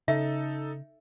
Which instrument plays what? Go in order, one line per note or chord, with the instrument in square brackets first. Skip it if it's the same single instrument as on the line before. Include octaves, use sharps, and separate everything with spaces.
[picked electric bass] C#3 [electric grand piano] D#4 A4 [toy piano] E5